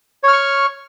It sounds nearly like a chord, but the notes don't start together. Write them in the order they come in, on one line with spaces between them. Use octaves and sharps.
C#5 F6 C#6